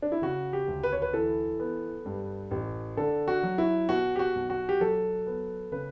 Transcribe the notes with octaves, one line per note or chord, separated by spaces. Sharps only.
D4
E4
C#3 F#4
G4
D2
B4
C#5
B4
E3 A4
B3
G2
A1
D3 A4
F#4
F#3
E4
B2 F#4
G4
F#4
B1
F#4
G4
F#3 A4
B3
C#3 B4